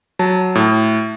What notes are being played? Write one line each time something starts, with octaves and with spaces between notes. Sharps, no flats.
F#3 A5
A2